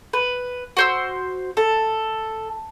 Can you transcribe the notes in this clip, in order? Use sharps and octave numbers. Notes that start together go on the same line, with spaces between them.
B4
F#4 C5 E6
A4